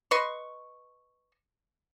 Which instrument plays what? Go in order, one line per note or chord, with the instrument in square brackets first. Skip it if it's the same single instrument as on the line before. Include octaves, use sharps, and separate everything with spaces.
[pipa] B4 D#5 C6 C#6